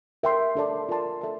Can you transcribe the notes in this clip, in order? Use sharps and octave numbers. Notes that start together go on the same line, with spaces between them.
A#4 E5 G5 C6
D4 A4 D5 A5
F4 A#4 D5 A5 C6
A4 E5 A5